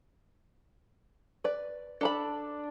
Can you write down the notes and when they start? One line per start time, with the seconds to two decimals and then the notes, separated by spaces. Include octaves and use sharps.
1.44 B4 D5
2.01 D4 A4 A#5 B5